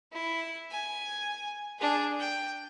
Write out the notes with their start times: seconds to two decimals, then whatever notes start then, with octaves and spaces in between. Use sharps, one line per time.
0.12 E4
0.71 G#5
1.79 D4 G#4
2.20 G5